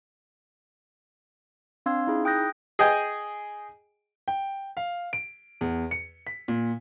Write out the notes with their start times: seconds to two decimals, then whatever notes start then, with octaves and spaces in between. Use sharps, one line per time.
1.86 C4 D4 F5 C6 E6 G#6
2.07 D#4 E4 G#4
2.25 G5 D#6 F#6 G6 A#6
2.79 G#4 D#5 G5 G#5
4.28 G5
4.77 F5
5.13 D7
5.61 E2
5.91 C#7
6.27 B6
6.48 A#2